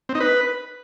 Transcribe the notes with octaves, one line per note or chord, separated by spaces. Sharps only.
C4
D#4
B4